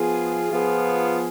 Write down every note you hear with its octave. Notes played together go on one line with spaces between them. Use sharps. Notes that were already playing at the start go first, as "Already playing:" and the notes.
Already playing: F3 B3 F4 G#4
F3 B3 F4 G#4